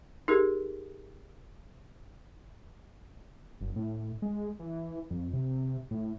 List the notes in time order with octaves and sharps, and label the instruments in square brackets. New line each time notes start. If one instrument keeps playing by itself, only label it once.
[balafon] D#4 G4 G#4 A#4
[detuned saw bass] F#1
A2
G#3
E3
F2
C3
A2